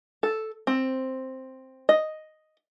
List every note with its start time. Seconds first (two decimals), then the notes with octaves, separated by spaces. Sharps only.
0.23 A4
0.67 C4
1.89 D#5